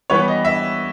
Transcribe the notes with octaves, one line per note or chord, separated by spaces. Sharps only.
E3 G3 B3 C#5
D#5
E5